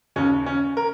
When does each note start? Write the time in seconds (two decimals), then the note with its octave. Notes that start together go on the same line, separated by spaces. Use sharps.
0.16 D#2 C#3 C#4
0.46 C#4
0.77 A#4